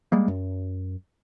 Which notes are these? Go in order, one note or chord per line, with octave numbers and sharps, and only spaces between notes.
G3 G#3 A#3
F#2